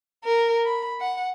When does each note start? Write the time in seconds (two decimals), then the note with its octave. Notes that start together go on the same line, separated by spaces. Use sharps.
0.24 A#4
0.66 B5
1.01 F#5